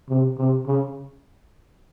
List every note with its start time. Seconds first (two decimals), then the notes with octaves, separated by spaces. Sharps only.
0.09 C3
0.38 C3
0.66 C#3